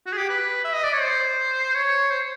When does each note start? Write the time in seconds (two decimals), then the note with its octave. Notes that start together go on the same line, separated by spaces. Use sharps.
0.07 F#4
0.13 G#4
0.18 G4
0.30 B4
0.65 E5
0.74 D#5
0.84 D5
0.93 C#5
1.02 C5
1.75 C#5
2.11 C5